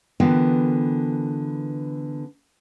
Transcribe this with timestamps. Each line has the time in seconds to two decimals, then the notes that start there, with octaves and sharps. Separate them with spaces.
0.20 D3 E3 B3 F4 A#4 G5